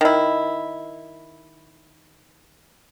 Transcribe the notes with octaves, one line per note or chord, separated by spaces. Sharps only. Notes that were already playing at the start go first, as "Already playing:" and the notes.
D#3 E4